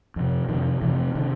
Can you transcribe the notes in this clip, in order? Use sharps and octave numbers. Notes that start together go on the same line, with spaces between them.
F2 C3
F2 C3 D#3
F2 C3 E3
C3 D#3